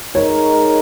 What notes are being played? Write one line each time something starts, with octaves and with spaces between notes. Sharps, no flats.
G#3 D#4 A#4 C#5